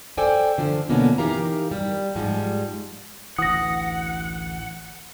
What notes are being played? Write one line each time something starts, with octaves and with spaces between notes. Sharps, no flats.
A4 C5 D5 G5 G#5
D3 F3 C5
B2 D3 F3 A#3 B3 C#4
E3 D#4 G4 A#4 F5 A#5
G3
G#2 F3 G3 G#3
A1 D2 E3 F#5 D#6 A#6